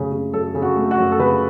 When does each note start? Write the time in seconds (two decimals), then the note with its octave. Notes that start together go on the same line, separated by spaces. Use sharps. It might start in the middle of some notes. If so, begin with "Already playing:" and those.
Already playing: F#2 C#3 A3
0.12 C#3
0.33 F#2 A4
0.55 C#3
0.62 F#4
0.77 A3
0.91 F#4
0.98 F#2
1.12 A4
1.19 C#3 B4